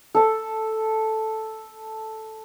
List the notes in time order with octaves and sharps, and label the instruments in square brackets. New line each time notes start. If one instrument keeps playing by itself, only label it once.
[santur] A4 A5